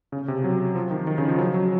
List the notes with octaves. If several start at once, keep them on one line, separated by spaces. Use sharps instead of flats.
C#3
C3
F#3
F3
D#3
D#3
C#3
F3
F#3
F#3